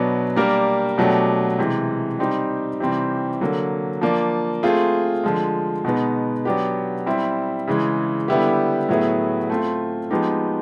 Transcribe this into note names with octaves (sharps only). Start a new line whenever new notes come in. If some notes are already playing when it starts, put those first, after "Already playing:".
Already playing: B2 F#3 B3 D4
G3 A#3 D4 G4 A#4
B2 F#3 A3 D4 G4
C3 E3 G#3
G3 C4 D#4 G4
C3 E3 G3 C4
D3 F#3 A#3
F3 A#3 D4
A3 C4 F4 G#4
D3 F3 G#3
B2 G#3 B3 D#4
F#3 B3 D4 G4
G3 C4 E4
C#3 E3 G#3
D3 G3 B3 E4 G4
A2 F#3 B3 E4 G#4
A3 C4 F4
F3 G#3 B3 D#4 G4